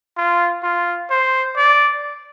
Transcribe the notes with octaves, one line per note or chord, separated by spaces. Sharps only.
F4
F4
C5
D5